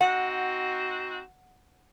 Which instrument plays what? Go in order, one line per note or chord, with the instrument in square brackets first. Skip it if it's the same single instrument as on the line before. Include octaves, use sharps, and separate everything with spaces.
[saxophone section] C4 D#4 F#4 [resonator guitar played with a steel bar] F#5